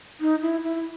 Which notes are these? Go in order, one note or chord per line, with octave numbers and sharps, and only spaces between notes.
D#4
E4
E4